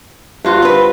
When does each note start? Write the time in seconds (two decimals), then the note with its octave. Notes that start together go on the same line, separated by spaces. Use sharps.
0.45 G2 F4 F#4
0.62 C4 B4